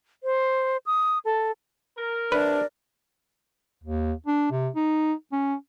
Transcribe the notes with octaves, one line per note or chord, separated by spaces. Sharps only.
C5
D#6
A4
A#4
C3 D4 B4 D5
D#2
D4
C3
D#4
C#4